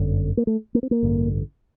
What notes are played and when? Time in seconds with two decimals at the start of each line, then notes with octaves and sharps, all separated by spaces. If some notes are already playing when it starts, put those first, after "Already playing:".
Already playing: G1 F#2 D3
0.37 A#3
0.47 A3
0.75 A#3
0.83 C4
0.91 A#3
1.02 A1 G2 D3